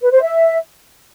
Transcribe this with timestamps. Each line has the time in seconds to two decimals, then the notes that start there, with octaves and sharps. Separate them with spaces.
0.01 B4
0.11 C5
0.22 E5